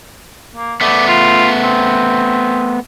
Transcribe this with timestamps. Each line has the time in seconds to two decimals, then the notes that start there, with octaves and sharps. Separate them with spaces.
0.56 A#3
0.81 A3 B3 D5
1.08 F4
1.63 C4